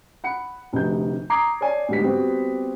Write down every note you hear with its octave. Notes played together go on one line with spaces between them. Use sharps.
F#5 B5 C#7
F1 D2 C3 G6
A#5 D6 D#6 G#6 C7
C#5 D5 G#5 A5
D2 G#2 G3 B3 B6
G3 B3 C4 F#4